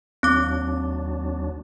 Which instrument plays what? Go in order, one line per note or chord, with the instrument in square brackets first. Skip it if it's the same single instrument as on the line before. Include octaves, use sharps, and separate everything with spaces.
[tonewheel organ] D#2 F#3 D4 [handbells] C4 D6